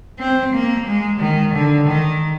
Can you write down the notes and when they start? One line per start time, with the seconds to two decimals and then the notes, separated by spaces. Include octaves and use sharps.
0.19 C4
0.54 A#3
0.87 G#3
1.21 D#3
1.53 D3
1.87 D#3